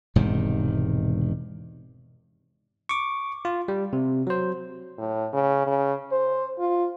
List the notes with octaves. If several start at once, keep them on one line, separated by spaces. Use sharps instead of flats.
E1 G#2 C3 D#3
C#6 D6
F4
G3
C3
F#3 C5
A2
C#3
C#3
C5
F4